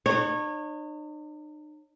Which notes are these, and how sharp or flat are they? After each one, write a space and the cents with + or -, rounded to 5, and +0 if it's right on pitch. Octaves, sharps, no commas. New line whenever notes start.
D#4 -45 C#5 -20